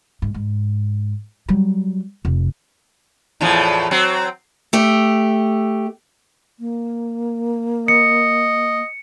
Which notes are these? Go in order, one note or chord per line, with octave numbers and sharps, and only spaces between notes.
G#2
G#2
F#3 G3
F1
E2 A2 F3
F#3 C4
A3 G4
A#3
D#5 C#7